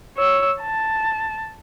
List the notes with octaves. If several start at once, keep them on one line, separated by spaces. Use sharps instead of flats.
C#5 E6
A5